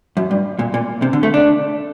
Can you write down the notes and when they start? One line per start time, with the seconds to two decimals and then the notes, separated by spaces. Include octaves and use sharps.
0.17 F#2
0.31 G2
0.59 A#2
0.74 A#2
1.02 C3
1.13 D3
1.23 A3
1.34 D4